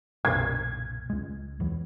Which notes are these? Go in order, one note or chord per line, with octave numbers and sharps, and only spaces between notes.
F#1 B1 A#2 G#6
C#2 G#3
E2 E3 F#3